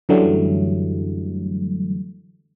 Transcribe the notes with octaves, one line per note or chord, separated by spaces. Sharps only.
F#2 D3 E3 F#3 G3 A3